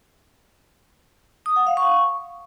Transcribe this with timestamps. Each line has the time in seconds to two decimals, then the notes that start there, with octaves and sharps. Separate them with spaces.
1.46 D#6
1.56 F#5
1.67 F5
1.77 C#6